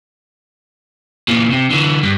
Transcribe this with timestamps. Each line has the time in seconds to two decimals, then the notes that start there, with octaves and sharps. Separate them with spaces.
1.28 A#2 E3
1.51 C3
1.70 D3 E3
2.03 G2